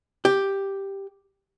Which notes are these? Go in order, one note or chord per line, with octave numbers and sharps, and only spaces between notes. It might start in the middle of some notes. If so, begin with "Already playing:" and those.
G4